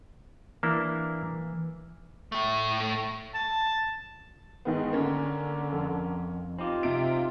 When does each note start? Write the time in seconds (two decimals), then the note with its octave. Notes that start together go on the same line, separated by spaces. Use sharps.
0.63 E3 A#3 D4 E4
2.32 A2 A3
3.34 A5
4.65 G#2 D#3 B3
4.93 D3 A#3 C#4
5.73 F2
6.59 C4 D#4 F4 G4
6.83 C3 D7